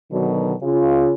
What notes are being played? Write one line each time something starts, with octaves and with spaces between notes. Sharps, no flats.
B2 D3 D#3 F#3
C#3 F4